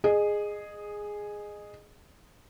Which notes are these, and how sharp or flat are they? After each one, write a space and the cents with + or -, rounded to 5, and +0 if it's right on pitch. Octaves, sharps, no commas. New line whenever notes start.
G#4 +0 D#5 -25